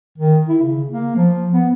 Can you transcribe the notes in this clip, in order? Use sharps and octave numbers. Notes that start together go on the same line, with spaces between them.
D#3
E4
C#3
A#3
F3
B3